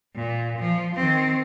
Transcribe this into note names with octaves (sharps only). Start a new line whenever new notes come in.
A#2
F3
D#3 C4